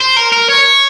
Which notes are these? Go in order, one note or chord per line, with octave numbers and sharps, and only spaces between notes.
C5
A#4
A#4
C#5